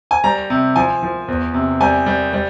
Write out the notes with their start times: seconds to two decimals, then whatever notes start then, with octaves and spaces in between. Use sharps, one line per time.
0.11 G#5
0.24 G3 A#5
0.50 C3
0.76 F3 G#5
1.03 F3
1.28 E2
1.54 C3
1.80 G3 G#5
2.06 G3
2.33 G3